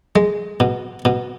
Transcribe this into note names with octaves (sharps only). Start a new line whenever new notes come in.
G#3
B2
B2